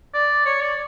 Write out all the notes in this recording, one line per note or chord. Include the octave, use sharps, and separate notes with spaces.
D5
C#5
D5